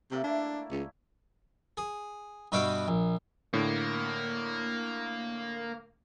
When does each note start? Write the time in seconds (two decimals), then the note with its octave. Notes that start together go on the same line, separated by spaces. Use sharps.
0.11 C3 A3 A#3 D5
0.24 D4 E4
0.71 C#2
1.77 G#4
2.52 G2 B2 F#4 E5 F5 G5
2.88 A#1
3.53 A2 D3 A#3